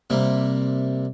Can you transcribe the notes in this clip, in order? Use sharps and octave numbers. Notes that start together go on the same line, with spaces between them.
C3 G3 A#3